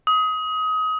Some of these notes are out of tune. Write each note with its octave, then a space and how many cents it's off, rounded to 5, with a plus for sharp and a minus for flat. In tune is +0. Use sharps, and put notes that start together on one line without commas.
D#6 +25